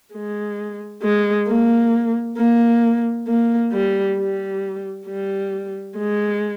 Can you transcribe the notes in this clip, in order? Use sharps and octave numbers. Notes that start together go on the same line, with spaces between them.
G#3
G#3
A#3
A#3
A#3
G3
G3
G3
G#3